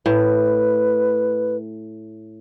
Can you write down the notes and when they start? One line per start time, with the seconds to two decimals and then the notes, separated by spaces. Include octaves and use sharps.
0.06 A2 B4